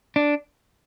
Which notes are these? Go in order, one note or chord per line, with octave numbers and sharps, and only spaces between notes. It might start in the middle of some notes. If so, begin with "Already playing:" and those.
D4